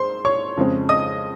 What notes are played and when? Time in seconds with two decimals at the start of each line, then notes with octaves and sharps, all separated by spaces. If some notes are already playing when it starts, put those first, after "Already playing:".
Already playing: G#2 C5 C6
0.25 C#5 C#6
0.57 F2 C#3 G#3 C4
0.89 D#5 D#6